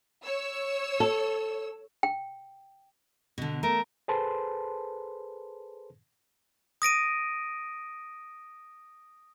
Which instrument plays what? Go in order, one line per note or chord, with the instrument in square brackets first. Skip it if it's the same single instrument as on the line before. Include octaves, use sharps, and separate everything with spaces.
[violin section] C#5 E6
[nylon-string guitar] A4
[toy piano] G5
[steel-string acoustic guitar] B2 D3
[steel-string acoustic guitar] A3 [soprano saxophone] A#4
[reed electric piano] G#4 A4 B4 C5 A5 C6
[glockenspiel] D#6 A#6 D7 D#7